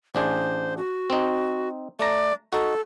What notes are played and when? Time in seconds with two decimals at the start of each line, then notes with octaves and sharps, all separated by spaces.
0.15 A1 D4 G#4 C5
0.77 F#4
1.10 C4 D#4
1.99 A3 D5 A#5
2.53 D#4 F#4 A4